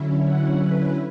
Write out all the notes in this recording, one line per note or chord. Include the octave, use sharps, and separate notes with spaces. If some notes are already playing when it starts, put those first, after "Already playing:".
Already playing: D3 F#3 C#4 E4
F#5
B4